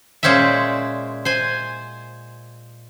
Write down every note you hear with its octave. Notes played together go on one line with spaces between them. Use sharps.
A#2 G#3 C#4 C5 D5 E5
C5 G#5